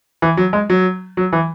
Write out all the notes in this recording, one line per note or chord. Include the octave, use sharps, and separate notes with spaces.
E3
F#3
G#3
F#3
F#3
E3